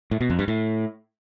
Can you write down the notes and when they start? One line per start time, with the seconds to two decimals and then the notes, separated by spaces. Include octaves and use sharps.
0.11 A2
0.21 B2
0.30 F2
0.39 G2
0.48 A2